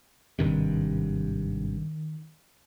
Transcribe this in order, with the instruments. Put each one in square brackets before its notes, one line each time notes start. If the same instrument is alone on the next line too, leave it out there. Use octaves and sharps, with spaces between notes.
[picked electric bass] G#1 G2 C3 [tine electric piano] D#3